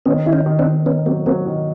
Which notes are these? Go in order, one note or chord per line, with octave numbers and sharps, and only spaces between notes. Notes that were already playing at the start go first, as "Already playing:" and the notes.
D#3 B3 C#4
D#3 E4
C#4 D#4
D#3
C4 D4
D#3
D#3 B3 C#4
F#3 A#3 C4
F#3 A#3 C4
D#3